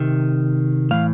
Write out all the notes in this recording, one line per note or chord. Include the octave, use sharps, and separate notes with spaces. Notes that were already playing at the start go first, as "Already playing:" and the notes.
Already playing: C3 D#3
A2 E3 F5